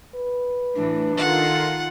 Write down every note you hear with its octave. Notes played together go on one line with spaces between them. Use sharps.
B4
A2 E3 D4
D#3 F4 A4 F#5